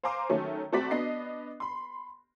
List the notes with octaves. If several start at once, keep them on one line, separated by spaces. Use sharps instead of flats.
C5 F5 G#5 A#5 C6 D6
D#3 F#3 A3 C#4
A3 C4 F#4 D5 A#5 B6
B3 D4 D#5 C7
B5 C6